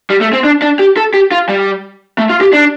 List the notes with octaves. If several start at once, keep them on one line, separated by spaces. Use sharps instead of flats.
G3
A3
C4
D4
D4
G4
A4
G4
F4
G3
A3
F4
G4
D4